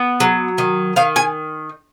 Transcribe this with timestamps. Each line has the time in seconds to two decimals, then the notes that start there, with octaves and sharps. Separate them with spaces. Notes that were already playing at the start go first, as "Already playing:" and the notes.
Already playing: B3
0.20 F#3
0.58 D#3
0.96 D#3 F5
1.16 G#5